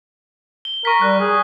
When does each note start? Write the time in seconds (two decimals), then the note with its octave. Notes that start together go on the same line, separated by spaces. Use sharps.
0.65 G7
0.85 A#4 C#6 B6
1.02 G3 F#6
1.20 G#4